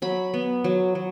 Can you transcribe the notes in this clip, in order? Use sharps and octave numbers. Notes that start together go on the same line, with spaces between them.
F#3 B5
B3
F#3
F#3